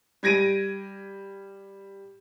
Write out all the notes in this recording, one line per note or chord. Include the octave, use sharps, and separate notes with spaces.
G3 G#6 A#6 D7 D#7